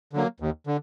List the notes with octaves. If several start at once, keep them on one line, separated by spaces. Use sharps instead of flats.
D3 F#3 A#3
D#2
D3